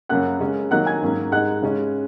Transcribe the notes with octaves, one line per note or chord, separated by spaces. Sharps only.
F#2 C#3 A#3 C#4 F#5 F#6
C#3 G#3 C#4
D#3 F#3 A#3 D#4 F#5 F#6
G#5 G#6
G#2 F#3 A#3 C#4
G#2 G#3 D#4 F#5 F#6
C#3 G#3 C#4